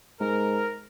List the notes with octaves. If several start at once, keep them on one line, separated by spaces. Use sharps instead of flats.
G#2 A#4